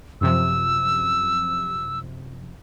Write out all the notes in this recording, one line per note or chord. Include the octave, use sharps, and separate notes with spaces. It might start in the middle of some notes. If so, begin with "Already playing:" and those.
F#2 C3 F3 E6